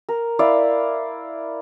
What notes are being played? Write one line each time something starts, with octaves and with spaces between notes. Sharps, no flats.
A#4
E4 D5 F5